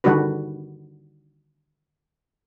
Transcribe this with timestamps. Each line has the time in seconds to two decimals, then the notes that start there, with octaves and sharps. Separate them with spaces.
0.04 D3 D#3 G3 D4 F#4 B4